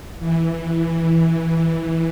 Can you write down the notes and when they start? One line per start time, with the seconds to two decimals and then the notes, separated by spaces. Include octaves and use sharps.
0.20 E3
0.82 E3